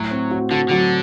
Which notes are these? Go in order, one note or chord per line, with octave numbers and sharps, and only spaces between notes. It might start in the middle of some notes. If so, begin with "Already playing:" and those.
Already playing: A2 F#3
C4
F#4
D3 F#4
D3 F#3